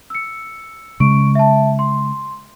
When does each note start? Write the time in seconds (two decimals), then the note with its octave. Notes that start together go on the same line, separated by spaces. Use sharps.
0.10 E6 C#7
1.00 C#3 G#3 C#6 D7
1.35 E5 A5
1.79 C6